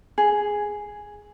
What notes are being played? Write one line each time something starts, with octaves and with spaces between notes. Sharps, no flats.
G#4